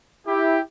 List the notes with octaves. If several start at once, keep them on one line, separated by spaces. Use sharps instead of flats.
E4 G4